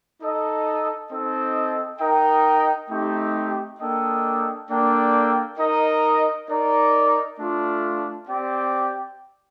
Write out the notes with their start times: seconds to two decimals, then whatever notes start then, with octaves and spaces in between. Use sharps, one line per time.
0.20 D#4 A4 D#5
1.10 C4 D#4 A4 D#5
1.99 D#4 A#4 D#5 G5
2.89 A3 C4 D#4 G4
3.79 A#3 D4 A4 D#5 G5
4.69 A#3 D4 A4 D5 G5
5.58 D#4 A#4 D#5
6.48 D#4 A#4 D5
7.38 A3 D4 F4
8.28 C4 G4 D5 G5